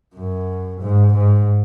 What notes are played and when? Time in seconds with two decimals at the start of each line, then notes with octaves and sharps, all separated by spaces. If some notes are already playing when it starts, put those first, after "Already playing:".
0.15 F#2
0.81 G#2
1.14 G#2